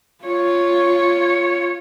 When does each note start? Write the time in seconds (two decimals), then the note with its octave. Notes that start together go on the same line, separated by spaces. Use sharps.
0.25 F4 C#5